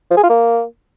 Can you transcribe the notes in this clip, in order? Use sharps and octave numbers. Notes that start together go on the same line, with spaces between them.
F3
G#4
F4
A#3